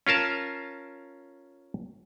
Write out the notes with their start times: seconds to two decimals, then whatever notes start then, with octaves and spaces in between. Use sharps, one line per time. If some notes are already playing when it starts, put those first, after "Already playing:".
0.07 C#4 F4 A#4 A5